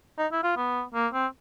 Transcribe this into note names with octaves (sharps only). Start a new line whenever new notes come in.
D#4
E4
F4
B3
A#3
C4